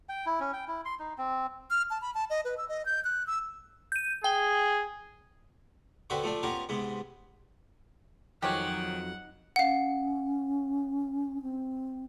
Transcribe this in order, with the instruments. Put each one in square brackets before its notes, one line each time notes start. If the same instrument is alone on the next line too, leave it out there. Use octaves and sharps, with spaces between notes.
[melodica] G5
E4
C#4
G5
E4
C6
D#4
C4
[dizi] F6
A5
B5
A5
D#5
B4
E6
D#5
G6
F#6
E6
[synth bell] G6 D#7
[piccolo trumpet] G#4 [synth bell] G5 G7
[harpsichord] D3 B3 C4 F#4 B4 G5
F3 A3 D4
B3 C#4 F4 G4 A#4
G#2 C3 B3
[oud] F2 F3 F#3 [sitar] D#3 [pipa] G4 G#4 C#5 [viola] F#5
[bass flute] C#4 [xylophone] F5 F#5
[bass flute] C4